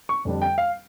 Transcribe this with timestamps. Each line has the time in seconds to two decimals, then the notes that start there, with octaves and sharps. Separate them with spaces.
0.09 C#6
0.25 F2 D3 G3 D4
0.41 G5
0.58 F5